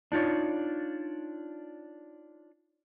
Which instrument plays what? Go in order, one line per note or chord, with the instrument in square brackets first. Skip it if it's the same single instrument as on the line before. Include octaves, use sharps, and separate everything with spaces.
[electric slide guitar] D4 D#4 F4 C#5